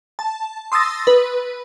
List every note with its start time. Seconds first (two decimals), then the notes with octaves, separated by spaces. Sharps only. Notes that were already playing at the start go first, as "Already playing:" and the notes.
0.19 A5
0.72 C6 D#6 E6 A6 A#6
1.07 B4